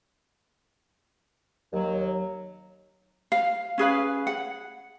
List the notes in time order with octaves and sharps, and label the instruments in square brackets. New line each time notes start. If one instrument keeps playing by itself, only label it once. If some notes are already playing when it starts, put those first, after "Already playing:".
[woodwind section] D#2 F#3
[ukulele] F5
C#4 G#4 B4 F5
F#5